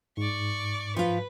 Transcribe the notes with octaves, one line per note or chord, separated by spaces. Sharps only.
G#2 D5 C#6
F3 F4 B4